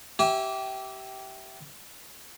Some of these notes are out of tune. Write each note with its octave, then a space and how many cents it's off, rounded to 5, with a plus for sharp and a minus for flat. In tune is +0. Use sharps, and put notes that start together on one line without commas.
G4 -20 E5 +0 G#5 -40